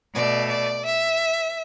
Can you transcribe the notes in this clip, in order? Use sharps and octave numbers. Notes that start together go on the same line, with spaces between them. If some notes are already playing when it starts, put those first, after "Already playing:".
B2 A3 D5
D5
E5